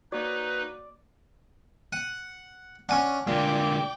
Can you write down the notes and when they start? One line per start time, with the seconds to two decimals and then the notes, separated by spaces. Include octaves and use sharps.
0.12 A#3 D#4 F#4 B4 D5
1.93 F#5 D#7
2.89 C#4 D4 F#5 G#5
3.27 A#2 D3 G#3 D5 G5 D6